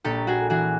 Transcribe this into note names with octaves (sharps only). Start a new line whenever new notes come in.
A#1 G4 A4
F#4 G#4
E3 F#4 G#4